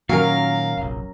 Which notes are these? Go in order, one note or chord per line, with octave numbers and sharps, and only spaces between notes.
A#2 D#3 F#3 A#3 C#4 A#4 F5
F1 A#1